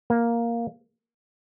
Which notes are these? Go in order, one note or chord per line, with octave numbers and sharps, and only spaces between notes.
A#3